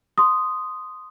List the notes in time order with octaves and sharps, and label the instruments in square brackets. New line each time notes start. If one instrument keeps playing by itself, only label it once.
[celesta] C6 D#6